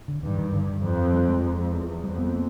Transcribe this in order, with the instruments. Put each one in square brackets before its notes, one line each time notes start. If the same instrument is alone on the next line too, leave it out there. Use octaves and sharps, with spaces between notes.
[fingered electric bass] D3
[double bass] G2 [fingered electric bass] D#3
[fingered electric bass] D#3
[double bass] G2 [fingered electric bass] D3
[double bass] F2 [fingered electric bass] F3
[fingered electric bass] G3
G#3
[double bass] F2
E2
[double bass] F2 [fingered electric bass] G3
[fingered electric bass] B3
A#3